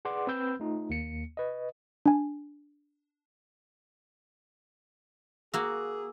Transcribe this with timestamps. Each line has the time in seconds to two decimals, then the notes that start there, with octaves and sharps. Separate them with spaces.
0.05 G#4 B4 D5 F#5 C6 D6
0.27 C4 B4 B5 E6 G6
0.60 A3 D#4 F4
0.90 D#2 A#3 C#7
1.37 B4 D#5
2.06 D4 G#5
5.54 A#3 F#4 G#4 E6